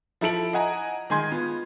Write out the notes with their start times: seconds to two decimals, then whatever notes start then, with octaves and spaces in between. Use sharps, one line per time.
0.21 F3 E4 A4 D7 F#7
0.53 D#5 F#5 G#5 A#5
1.10 D#3 G#3 G#5 C6 G#6
1.31 B3 F4